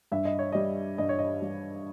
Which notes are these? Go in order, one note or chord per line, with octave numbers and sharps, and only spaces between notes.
G2 E5
D#5
C#5
G3 D#5
G2 D#5
C#5
D#5
G3